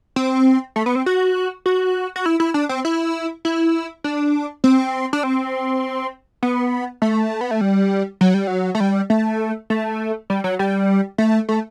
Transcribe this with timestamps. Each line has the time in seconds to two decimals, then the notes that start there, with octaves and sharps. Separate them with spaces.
0.16 C4
0.76 A3
0.86 B3
0.95 C4
1.06 F#4
1.66 F#4
2.16 F#4
2.26 E4
2.40 E4
2.54 D4
2.69 C4
2.85 E4
3.45 E4
4.04 D4
4.64 C4
5.13 D4
5.23 C4
6.43 B3
7.02 A3
7.41 B3
7.51 A3
7.61 G3
8.21 F#3
8.34 G3
8.47 F#3
8.75 A3
8.80 G3
9.10 A3
9.70 A3
10.30 G3
10.44 F#3
10.59 G3
11.18 A3
11.49 A3